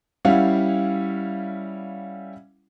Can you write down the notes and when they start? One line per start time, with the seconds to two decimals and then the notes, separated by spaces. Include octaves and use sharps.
0.25 G3 C#4 E4 F5 F#5